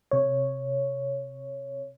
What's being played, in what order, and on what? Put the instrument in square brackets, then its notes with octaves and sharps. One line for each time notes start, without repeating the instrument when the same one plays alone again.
[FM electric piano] C3 C#5